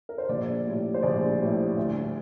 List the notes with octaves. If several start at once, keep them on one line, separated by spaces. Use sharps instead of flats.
A#4
C5
A#1 D5
A2 G3
C5
A#1 D5
A2 G3
D2